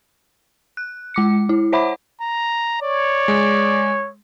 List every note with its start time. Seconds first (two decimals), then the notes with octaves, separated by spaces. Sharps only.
0.77 F#6
1.14 G#3 D6 C#7
1.49 E4
1.72 C5 C#5 E5 F#5 B5 D6
2.21 A#5
2.82 C#5 D5
3.28 G#3